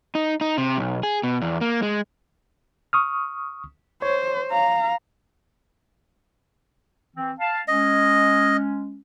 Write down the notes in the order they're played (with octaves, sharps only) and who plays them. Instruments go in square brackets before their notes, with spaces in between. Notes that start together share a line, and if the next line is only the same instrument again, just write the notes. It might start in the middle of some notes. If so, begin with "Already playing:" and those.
[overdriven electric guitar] D#4
D#4
C3
B1
G#4
B2
E2
A#3
G#3
[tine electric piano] C#6 D#6 F6
[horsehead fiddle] C5 [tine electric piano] C#5
[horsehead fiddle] F5 A#5
[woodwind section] E3 C4
F5 A5
[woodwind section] G#3 C#4 [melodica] D#5